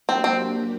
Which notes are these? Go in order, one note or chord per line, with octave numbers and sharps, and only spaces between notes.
F#3 A#3 C4 D4 G4
C4